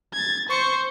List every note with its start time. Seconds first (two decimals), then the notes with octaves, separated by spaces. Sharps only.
0.14 G#6 A6
0.50 C5 C#6